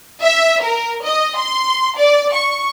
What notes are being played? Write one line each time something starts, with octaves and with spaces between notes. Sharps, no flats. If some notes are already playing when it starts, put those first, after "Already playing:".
E5
A#4
D#5
C6
D5
C#6